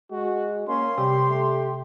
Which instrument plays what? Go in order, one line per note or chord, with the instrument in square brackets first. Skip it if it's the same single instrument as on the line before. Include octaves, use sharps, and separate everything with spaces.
[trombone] G#3 [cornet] F#4
[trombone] A#3 [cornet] C#4 [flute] C6
[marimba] C3 [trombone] G3 [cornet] G4
[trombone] A3